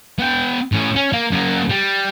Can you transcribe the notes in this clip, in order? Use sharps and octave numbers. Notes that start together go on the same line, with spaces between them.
B3 G5
A2 C#4
C#4
A#3
F#2 A#3
G3